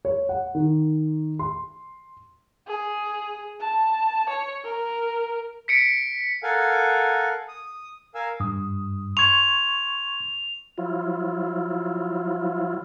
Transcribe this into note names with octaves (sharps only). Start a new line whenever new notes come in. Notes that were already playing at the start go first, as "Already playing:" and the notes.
C#5
F#5
D#3
C6
G#4
A5
C#5
A#4
B6 C#7 D7
A4 A#4 F5 F#5 G#5
D#6
A#4 F5 G#5 E6
G2 D#6
C6 C#6 G#6 F7
F3 F#3 E4 F4